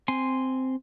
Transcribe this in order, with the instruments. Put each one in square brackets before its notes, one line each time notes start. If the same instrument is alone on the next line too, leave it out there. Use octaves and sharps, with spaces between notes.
[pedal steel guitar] C4 G#5 C6